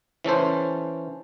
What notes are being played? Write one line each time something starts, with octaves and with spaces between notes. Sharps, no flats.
E3 C#4 A4 C5